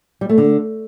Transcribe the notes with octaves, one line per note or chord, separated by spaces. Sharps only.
G3
A3
D3